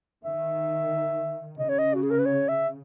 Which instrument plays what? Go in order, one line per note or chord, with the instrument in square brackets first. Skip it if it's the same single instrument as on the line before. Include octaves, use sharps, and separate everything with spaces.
[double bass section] D#3 [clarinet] E5
[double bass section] C#3 [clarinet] D#5
[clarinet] C#5
D#5
F#4
G#4
A#4
B4
C#5
E5